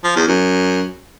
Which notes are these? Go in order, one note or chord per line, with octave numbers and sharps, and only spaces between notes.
F3
E2
F#2